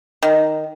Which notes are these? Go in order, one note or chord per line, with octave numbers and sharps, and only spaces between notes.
D#3